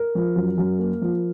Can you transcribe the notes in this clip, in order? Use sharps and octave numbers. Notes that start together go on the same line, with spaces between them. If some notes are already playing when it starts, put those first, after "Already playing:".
Already playing: A#4
F3
F#2
F#2
A#3
F3